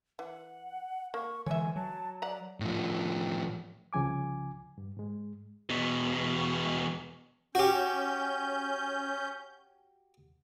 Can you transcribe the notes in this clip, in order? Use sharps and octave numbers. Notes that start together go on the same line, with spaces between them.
E3 F#5
A#3 C#6
D3 E3 G#3 C#5 E5 G#5
F#3 A5
D5 F#5 A#5
A2 F3
C2 C#3 F3 G#5 D6
G2
G#2 G#3
E2 B2
C#4 F#4 G4 G6